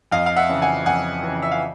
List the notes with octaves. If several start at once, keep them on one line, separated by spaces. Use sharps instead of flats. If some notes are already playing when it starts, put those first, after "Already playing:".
F2 D#5 F5
F5
E5 F#5
C#3 E3
F#5 G#5
F2 F#5 G#5
C#3 E3
E5
F5